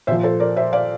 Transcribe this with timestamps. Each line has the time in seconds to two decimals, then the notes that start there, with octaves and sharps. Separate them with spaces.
0.07 A#2 F3 C5 E5
0.23 A4 C5
0.40 A#4 D5
0.56 C5 E5
0.73 D5 F5